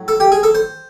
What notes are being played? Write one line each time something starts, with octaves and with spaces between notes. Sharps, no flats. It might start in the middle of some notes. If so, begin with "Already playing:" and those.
Already playing: A2 F#3
A4
G4
G#4
A4
C5